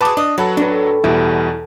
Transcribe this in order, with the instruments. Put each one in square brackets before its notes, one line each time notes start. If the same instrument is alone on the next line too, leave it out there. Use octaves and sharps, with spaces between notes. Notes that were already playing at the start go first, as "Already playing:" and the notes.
[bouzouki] F#4 G#4 [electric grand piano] B4 A5 D6
[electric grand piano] D4 [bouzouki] D#5
[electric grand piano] F#3 F#4 A4 [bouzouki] B4
[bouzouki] A2 [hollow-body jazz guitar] D4 B4
[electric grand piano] E2 B2 [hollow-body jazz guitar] G3 E4